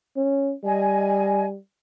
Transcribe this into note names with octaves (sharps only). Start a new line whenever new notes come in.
C#4
G3 D#5 G#5